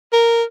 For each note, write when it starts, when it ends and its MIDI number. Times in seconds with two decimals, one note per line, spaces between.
0.13 0.43 70